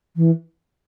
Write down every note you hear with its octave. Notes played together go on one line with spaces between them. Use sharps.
E3